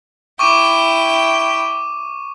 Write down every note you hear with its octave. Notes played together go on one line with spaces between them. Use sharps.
E4 G5 C#6 D6 D#7